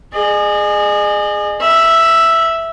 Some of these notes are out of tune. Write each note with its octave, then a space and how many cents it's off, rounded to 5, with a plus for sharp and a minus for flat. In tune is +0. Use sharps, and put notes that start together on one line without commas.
G#4 +0 D#5 -40
E5 +5 B5 -25